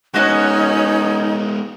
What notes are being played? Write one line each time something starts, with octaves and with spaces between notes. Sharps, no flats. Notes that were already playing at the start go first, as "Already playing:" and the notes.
G#3 B3 C#4 D#4 F#4 D#5 F#6